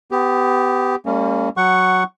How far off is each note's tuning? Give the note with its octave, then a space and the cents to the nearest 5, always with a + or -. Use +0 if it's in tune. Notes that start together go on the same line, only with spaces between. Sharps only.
B3 +20 G4 -5
G3 +35 A#3 -30 C#4 +0
F#3 +0 F#5 +10 C#6 +0